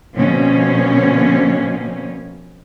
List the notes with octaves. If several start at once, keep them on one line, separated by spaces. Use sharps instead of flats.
B2 D3 F3 A#3 C4 C#4